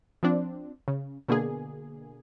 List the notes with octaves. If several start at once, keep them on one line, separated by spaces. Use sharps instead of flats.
F3 C4 D4
C#3
B2 D3 A#3 G#4